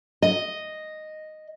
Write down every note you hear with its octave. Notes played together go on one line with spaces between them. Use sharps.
D#5